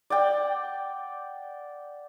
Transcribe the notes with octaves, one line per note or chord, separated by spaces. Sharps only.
D5 F#5 G5